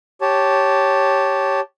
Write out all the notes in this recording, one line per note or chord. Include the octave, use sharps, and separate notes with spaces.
G4 C#5 A5